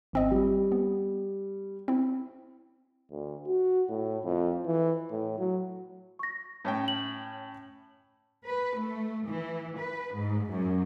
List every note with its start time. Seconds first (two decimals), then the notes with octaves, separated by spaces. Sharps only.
0.13 G#1 C4 D#5
0.31 G3
0.72 B3
1.88 C4 E4
3.11 D2
3.47 F#4
3.89 A2
4.24 F2
4.66 E3
5.11 A2
5.39 F#3
6.19 C#6 A#6
6.65 A2 C#4 G5
6.88 F#7
8.44 B4
8.76 A3
9.26 E3
9.77 B4
10.14 G#2
10.50 F#2